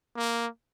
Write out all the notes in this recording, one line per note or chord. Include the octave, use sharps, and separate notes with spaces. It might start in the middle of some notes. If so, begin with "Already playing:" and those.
A#3